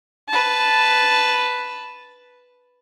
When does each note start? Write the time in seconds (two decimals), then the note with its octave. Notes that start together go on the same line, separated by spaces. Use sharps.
0.29 B4 A5